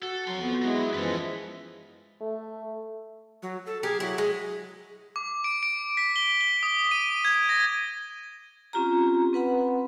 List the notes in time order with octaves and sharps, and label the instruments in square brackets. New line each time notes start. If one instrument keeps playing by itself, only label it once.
[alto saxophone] F#4 [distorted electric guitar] A4
[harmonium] F2 [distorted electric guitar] F3 C6 [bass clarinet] F#3
[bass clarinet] B3
[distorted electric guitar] F#3 [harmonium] G#3 E4
[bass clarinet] F#2 [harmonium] E3 F3 G#3 [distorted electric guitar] A4 B4
[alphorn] A3
[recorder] F#3
A4
[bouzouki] G4 A#4 [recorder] G#4
[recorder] F#3 [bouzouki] E4
[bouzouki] G#3
[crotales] D6
D7
D7
B6
G7
G7
D#6
D#7
G#6
A#6
[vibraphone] C4 C#4 F4 G4 A#5
C4 B4 F#5 B5